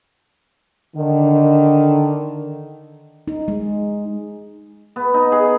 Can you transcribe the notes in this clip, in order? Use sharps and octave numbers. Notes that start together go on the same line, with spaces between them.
D3 D#3
D#4
G#3
B3
D#4
G#4